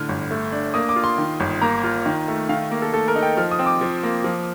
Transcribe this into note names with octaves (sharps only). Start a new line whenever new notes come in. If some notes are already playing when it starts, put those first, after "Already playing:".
Already playing: A2 D3 F6
G1
A3
D4
A#3 D#6
D6
F4
C6
D#3
G1
A#3 A#5
F4
D#3
A3
D#3 F5
A#3
A4
A3 A4
A#4
D#4
G5
F3 F6
D#6
C4
D6
F3
A#3
F3